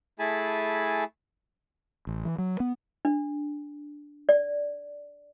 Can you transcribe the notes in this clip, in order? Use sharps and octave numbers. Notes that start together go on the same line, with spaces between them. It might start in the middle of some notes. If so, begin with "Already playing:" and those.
A3 E4 G#4 G#5 A5 B5
A1
E3
F#3
B3
D4
D5